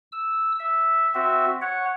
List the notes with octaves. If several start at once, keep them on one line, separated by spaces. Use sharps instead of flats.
E6
E5
C4 F#4 E5
C#5 F#5